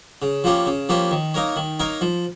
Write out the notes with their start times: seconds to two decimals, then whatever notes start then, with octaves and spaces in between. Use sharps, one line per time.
0.22 C#3
0.44 F3 A#3 C#4 G4
0.66 C#3
0.89 F3 A#3 C#4 G4
1.11 D#3
1.34 A#3 D#4 A#4 C#5
1.56 D#3
1.80 A#3 D#4 A#4 C#5
2.01 F3